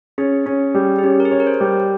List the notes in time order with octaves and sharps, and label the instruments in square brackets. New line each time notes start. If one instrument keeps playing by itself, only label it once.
[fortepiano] C#4 [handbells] G#4
[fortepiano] C#4
G3
[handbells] G#4
[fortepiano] C#4 [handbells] G4
[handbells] A#4
G#4
[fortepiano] C#5
[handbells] A#4
C5
[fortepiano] G3